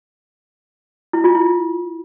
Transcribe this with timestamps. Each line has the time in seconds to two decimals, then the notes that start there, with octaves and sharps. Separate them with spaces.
1.13 E4
1.24 F4
1.35 E4